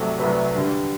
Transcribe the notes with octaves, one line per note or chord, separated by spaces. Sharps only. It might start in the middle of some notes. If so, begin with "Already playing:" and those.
Already playing: C2 C3 F#3 A3 A4
C2 C3 F#3 A3 B4
G2 D3 G3